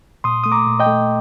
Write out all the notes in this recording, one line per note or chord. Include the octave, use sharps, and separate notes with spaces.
A#2 C6 D#6
A3 D#6
A#5 D6
A#2
D#5 G5
A3